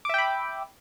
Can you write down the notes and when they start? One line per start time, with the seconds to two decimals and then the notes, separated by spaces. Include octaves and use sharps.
0.05 D6
0.09 E5
0.14 G5
0.18 B5